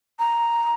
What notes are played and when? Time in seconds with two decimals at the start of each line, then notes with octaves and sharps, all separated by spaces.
0.19 A#5